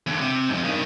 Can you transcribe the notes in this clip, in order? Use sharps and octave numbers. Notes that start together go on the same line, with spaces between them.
E2 D3
C3
F2 G#2
G2 D#3